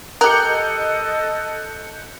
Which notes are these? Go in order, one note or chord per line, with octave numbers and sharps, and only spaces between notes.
G4 A4 A#4 D#5 F#6 G6 C#7